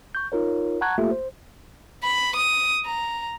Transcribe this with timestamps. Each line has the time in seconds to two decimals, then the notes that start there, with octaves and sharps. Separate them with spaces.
0.15 C#6 G6
0.32 D#4 F4 A#4 C#5
0.81 F#5 A5 A#5 C#6 F#6 G#6
0.98 A3 A#3 F4 G4 A4 E5
1.11 C5
2.04 B5
2.36 D#6
2.86 A#5